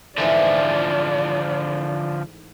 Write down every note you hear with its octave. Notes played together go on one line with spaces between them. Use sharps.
G#2 D3 E3 F3 A3 D5